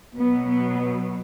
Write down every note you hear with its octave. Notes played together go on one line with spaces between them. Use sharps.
B2 F#3 B3
B3